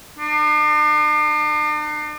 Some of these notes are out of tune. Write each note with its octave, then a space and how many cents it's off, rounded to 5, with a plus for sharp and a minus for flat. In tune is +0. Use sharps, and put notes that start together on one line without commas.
D4 +45